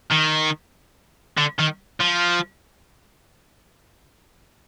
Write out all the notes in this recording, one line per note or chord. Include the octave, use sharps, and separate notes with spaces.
D#3
D3
D#3
F3